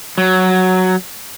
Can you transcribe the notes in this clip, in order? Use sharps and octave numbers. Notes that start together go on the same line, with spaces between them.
F#3